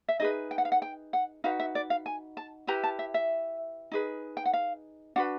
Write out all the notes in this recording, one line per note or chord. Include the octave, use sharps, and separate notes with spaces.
E5
D#4 G#4 B4 D#5
G5
F#5
F5
F#5
G5
F#5
D#4 F#4 B4 F5
E5
D5
F5
G#5
A5
E4 G4 B4 A#5
A5
E5
E5
D#4 G#4 B4
G5
F#5
F5
D4 F#4 B4 F#5